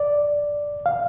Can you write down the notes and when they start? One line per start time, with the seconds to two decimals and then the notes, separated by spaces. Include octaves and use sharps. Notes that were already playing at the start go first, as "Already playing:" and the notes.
Already playing: D5
0.86 F5